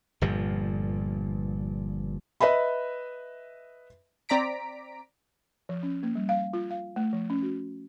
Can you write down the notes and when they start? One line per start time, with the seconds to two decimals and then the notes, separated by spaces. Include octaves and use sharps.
0.21 G1 G2 A#2 F3
2.41 B4 D#5 E5 B5
4.29 C4 D5 A#5 B6 D7
5.69 F3
5.83 C#4
6.03 A#3
6.15 G3
6.29 F5
6.53 F4
6.70 F5
6.96 A3
7.13 F3
7.30 C#4
7.42 F#4